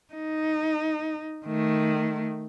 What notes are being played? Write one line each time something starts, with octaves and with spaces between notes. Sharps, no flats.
D#4
D#3 A3